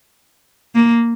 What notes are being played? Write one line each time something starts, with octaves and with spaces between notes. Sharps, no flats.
A#3